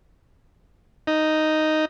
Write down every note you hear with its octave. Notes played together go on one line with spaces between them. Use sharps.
D#4